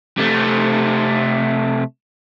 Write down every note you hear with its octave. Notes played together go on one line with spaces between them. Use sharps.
C3 A3